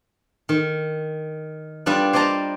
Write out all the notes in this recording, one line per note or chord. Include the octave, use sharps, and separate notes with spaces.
D#3
G3 B3 D4 F4 D5
C5 D5 D#5 G5 A5 A#5